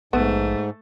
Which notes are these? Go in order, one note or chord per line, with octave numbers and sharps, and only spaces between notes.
A#1 G#2 A3 B3